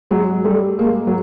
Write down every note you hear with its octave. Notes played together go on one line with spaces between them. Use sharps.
F#3 G#3
G3 A3
G#3 A#3
F#3